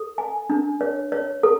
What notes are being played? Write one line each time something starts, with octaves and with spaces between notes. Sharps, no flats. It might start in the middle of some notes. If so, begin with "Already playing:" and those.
Already playing: A4
G#5
D4
C#5
C#5
A4